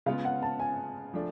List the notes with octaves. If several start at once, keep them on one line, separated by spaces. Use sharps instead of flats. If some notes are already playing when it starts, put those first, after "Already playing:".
C#3 G#3 B3 F4 F5
F#5
A5
G#5
F3 A3 D4